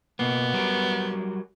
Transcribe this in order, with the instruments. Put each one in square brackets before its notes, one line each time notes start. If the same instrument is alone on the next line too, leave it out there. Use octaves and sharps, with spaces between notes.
[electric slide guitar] B2 A#3 [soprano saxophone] B3
[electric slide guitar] F#3 G3 A#4